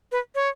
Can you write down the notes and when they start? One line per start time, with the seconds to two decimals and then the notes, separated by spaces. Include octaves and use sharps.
0.12 B4
0.35 C#5